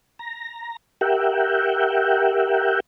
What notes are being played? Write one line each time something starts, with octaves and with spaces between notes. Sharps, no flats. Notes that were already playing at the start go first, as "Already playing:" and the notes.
A#5
G4 A#4 E5 F#5 G5